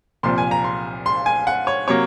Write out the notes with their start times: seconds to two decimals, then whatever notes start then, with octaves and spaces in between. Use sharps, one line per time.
0.23 C2 A#2 F3 C6
0.38 G#5
0.51 A#5
0.64 C6
1.06 C6
1.26 G#5
1.47 F#5
1.67 C#5
1.88 C3 F#3 A#3 C#5